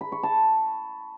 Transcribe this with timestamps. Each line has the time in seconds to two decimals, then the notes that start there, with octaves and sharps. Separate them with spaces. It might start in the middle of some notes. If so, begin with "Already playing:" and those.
0.01 B5
0.12 C#6
0.23 A5